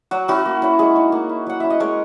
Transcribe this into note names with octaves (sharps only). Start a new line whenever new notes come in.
F#3 F#4
C#4 E4 F#4
A#3
C#4 E4
G#3 G#4
D#4
A#3
E4
F#3 F#5
C#4 E4 E5
D#5
G#3 A#4 C#5